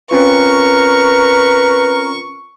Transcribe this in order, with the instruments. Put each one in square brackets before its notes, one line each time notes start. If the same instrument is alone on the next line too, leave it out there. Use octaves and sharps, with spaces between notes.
[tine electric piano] C4 C#4 F4 [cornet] A#4 [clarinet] B4 [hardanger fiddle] C#6